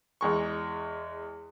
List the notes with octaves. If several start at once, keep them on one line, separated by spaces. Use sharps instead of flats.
E2 G#3 C#6